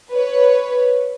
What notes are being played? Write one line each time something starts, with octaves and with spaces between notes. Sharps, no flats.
B4 C#5